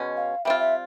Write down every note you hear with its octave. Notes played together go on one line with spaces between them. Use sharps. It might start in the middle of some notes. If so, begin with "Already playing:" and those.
Already playing: B2 G#3 C#4
F5
G3 C4 F4 E5
E5